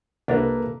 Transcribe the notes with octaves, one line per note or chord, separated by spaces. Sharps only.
C2 A#3 D4 A4 B4 A#5